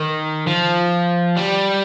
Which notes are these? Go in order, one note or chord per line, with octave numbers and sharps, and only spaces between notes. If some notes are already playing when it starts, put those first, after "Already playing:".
Already playing: D#3
F3
G3